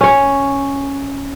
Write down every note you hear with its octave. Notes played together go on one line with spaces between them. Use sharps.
C#4 C#5